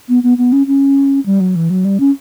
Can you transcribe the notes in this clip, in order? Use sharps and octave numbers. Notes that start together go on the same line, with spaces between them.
B3
B3
B3
C#4
C#4
G3
F#3
E3
F#3
G3
C#4